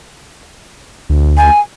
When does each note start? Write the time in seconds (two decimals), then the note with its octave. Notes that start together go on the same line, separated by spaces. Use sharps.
1.09 D2
1.37 G#5